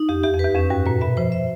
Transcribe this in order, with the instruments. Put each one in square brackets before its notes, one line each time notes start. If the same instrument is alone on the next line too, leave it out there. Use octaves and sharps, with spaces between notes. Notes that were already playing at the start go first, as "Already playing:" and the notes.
Already playing: [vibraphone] D#4
[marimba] F2 [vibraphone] G4
[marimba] E2 [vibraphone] G4
[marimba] F2
[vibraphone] B4
[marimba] E2
[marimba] F2 [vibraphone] C#4
[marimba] G2 [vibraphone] F#4
[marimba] A#2 [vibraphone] B4
[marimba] B2 [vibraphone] E5
[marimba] F3 [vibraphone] C5
[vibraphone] E5